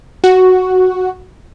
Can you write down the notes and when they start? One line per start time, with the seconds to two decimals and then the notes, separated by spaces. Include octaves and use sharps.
0.24 F#4